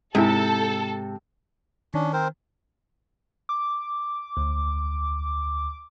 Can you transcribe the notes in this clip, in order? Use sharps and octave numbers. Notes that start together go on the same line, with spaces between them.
G#2 C3 G#3 E4 G#4 A4
D#3 C#4 D4
C4 A#4 C5
D6
D2